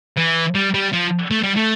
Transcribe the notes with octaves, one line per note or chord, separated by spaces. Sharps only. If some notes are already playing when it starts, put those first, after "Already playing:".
E3
G3
G3
F3
A3
G3
A3